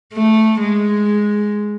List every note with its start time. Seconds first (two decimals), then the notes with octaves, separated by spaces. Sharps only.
0.13 A3
0.61 G#3